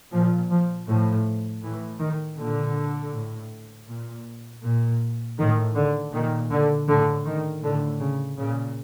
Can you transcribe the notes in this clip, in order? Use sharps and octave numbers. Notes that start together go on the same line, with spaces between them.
A#2 F3
F3
A2 F3
A2 E3
D#3
A#2 D3
A2
A#2
A#2
A2 D#3
D3
A#2 D#3
D3
A2 D3
D#3
A2 D3
C#3
A#2 C#3